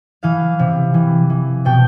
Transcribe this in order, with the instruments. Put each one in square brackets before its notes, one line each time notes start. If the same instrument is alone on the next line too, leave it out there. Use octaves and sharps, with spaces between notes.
[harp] E3 F5
C3
E3
E3
B2 G5